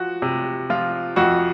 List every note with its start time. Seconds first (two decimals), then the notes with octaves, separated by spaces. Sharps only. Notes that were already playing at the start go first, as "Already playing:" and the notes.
Already playing: F3 F#4
0.22 C3
0.70 F3 F4
1.16 F2 F#4